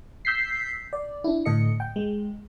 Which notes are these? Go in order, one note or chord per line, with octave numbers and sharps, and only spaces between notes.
E6 G6 B6 C7
D5
D4 E4
A2 D3 A4 D#5 C#7
G5
G#3